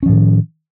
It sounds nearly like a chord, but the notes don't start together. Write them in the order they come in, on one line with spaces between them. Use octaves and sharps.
C#4 F3 A2 D#3